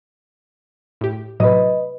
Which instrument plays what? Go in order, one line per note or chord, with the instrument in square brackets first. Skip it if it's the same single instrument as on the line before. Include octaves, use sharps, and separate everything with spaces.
[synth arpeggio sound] A2 G4
[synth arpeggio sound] A2 C3 F#3 [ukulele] B4 D#5